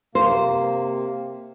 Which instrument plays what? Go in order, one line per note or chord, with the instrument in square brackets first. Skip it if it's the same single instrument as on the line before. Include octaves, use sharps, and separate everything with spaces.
[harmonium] C3 A#3 [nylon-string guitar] C5